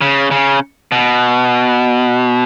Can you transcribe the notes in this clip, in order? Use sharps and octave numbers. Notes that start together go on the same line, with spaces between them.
C#3
C#3
B2